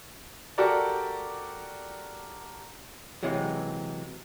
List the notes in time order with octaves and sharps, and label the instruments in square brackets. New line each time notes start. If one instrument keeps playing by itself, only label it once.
[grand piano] F#4 G4 A4 A#4 D5
[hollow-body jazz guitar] C3 E3 F#3 G#3